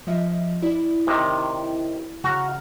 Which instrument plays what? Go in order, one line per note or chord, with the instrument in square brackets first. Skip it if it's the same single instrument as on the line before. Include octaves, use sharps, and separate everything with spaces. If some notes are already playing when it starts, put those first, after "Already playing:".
[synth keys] F3 D#5 E5
E4 D5
[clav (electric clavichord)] C3 D#3
[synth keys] C#3 A#5 F6 [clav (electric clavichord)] F#4